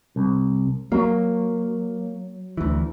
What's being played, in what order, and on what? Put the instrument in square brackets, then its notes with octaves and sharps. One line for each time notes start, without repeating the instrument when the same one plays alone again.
[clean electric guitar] C2
[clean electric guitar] F#3 [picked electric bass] A#3
[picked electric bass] D2 E3